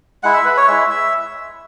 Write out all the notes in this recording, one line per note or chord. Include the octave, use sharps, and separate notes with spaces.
G#3 E4 F#5
E5
B4
C#5
G#3 E4 E5
E5